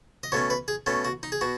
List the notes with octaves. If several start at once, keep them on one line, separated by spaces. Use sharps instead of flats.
D#5
B2 A3 C#4 C#5
B4
G#4
B2 A3 C#4
F#4
D#4
G#4
B2 F#4